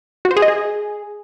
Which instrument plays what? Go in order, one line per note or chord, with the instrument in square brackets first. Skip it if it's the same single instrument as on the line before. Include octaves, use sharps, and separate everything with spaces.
[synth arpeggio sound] F#4
C5
G#4
D#5
G#4